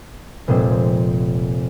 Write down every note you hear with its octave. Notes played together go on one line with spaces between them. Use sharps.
F1 A#2 G#3 C4